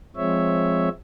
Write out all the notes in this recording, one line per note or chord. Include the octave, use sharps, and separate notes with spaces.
F3 G#3 C4 C#5 E5